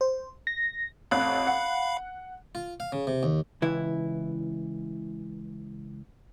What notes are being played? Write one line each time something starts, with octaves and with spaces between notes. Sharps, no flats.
C5
A#6
A1 F2 F5 B5 F#6
F#5
F4
F5
C#3
C3
D#2
C#2 E3 E4